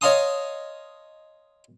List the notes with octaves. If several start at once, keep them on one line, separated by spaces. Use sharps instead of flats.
C#5 D#5 F5 A5 C6 D#6